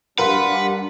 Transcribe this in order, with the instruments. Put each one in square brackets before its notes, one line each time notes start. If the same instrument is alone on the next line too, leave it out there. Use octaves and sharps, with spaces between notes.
[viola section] G3 D4 [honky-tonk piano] A#4 F5 C6 [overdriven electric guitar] B4 [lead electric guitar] F#5